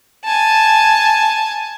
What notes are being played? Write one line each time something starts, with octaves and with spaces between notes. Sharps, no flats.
G#5 A5